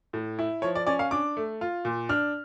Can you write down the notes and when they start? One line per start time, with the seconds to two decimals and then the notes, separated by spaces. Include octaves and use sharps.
0.13 A2
0.39 E4
0.62 F3 C#5
0.75 D5
0.87 C#4 D5
0.99 F5
1.11 D4 D6
1.37 A3
1.61 F4
1.85 A#2
2.09 D4 F6